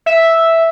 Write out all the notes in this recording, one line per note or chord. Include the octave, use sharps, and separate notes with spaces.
E5